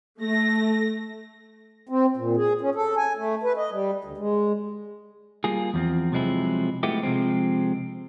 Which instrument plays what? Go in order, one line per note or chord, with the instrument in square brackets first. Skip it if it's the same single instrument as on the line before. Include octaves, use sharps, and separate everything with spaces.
[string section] A3 A#6
[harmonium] C4
A#2
G#4
C#4
A4
G#5
A3
B4
D#5
G3
D2
G#3
[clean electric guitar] G3 A#3 F4 G#4
E2 F3 C4
C3 F3 F#3 G#3 C4 E4
F3 G#3 A3 B3 E4 G4
C3 F3 G#3 C4